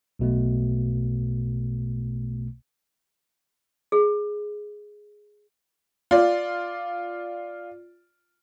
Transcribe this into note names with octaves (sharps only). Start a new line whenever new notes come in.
B1 B2 A3
G#4
F4 D5